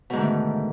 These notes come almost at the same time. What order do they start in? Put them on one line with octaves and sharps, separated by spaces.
B2 G#2 D3 D#3 A3